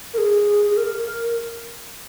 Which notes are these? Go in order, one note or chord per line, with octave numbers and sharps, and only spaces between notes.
A#4
G#4
G#4
A#4